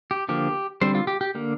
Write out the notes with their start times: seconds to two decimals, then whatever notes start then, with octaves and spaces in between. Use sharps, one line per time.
0.11 G4
0.29 D3 F3 A#3 G4
0.81 D3 G3 C4 C5
0.95 F4
1.07 G4
1.21 G4
1.35 D3 A#3